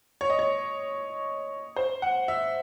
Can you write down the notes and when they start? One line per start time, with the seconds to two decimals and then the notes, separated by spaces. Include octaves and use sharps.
0.21 C#5
0.30 D#5
0.39 C#5
1.76 C5
2.02 F#5
2.28 E5